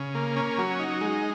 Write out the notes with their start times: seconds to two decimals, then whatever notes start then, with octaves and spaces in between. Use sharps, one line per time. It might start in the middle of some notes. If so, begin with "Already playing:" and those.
Already playing: C#3
0.15 A#3
0.36 C#4
0.58 F#3
0.80 D#4
1.01 G#3